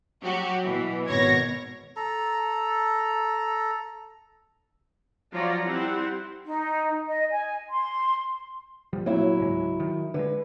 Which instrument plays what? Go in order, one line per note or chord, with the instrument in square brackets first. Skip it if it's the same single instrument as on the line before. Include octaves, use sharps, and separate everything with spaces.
[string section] F#3 F#4 G4
B2 E3
G#1 B2 C#5 G#6 A#6
[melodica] A4 A#5
[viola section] F3 F#3 F4 C#5 D5 A#5
G3 C4 E4 G4 F#5
[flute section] D#4
D#5
G#5
C6
[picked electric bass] F1 F3 G3
[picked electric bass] A#2 A#3 C4 [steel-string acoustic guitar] F#3 E4
[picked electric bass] C#2 G#2 G#3
D#3
[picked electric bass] D3 F3 G#3 [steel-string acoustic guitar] B4